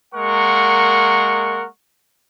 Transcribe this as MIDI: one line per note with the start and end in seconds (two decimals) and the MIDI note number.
0.15 1.67 56
0.15 1.67 58
0.15 1.67 70
0.15 1.67 78
0.15 1.67 85